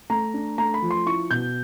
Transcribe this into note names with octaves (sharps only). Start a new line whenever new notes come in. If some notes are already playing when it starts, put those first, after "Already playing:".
A3 A#5
D4
A3 A#5
B5
F3
C6
E4 C#6
B2 G6